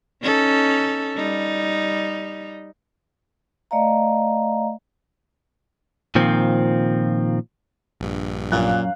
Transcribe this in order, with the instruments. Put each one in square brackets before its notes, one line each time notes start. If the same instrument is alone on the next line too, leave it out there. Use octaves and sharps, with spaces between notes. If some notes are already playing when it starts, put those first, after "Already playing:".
[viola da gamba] C#4 D#4 A4
G3 D#4
[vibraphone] A3 D5 D#5 F5 A#5
[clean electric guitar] A#2 D#3 F3 C4
[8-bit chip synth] A#1 G2
[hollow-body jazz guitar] F#2 [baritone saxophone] A#2 [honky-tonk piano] F5 F#6